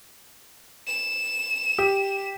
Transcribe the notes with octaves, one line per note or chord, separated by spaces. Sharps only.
E7
G4